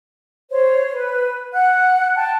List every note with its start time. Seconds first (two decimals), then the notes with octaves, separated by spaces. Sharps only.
0.50 C5 C#5
0.91 B4
1.53 F#5 F#6
2.16 G5 A5